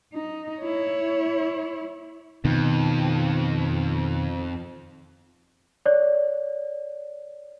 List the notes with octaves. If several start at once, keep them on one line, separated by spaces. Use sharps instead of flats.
D#4
E4 C#5
F2 B2 D#3
C#5 D5